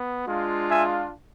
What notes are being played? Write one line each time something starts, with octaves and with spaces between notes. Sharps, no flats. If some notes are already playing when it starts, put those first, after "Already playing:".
Already playing: B3
G#3 D4 F4
E5 G#5